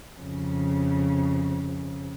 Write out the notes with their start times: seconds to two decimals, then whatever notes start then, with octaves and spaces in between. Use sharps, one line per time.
0.19 F2 C#3